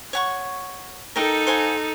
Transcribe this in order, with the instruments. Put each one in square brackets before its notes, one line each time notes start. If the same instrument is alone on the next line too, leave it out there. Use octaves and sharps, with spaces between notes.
[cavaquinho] C#5 F#5 C#6
[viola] D#4 A4 [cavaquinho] A#4 G5
[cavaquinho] C5 F#5 G#5